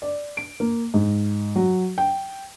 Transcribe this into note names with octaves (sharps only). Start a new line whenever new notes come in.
D5
D7
A#3
G#2
F#3
G5